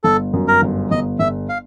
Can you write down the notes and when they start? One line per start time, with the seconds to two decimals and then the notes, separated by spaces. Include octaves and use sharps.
0.04 G1 A4
0.33 F#2
0.48 A#4
0.62 G1
0.91 G1 D#5
1.19 G1 E5
1.49 F5